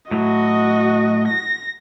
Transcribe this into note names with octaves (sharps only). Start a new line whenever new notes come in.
A2 F#3 F#4 D#5
A#6